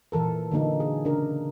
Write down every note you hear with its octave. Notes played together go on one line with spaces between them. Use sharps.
A#2 E3 A4 A#4
D3 F#3 A#3 D#4 A4
G#4
C#3 D4 A#4